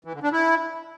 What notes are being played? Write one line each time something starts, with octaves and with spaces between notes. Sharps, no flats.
E3
D3
D4
E4